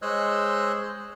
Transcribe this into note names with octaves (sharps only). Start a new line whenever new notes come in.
G#3 C5 C#5 D#5 E6 F#6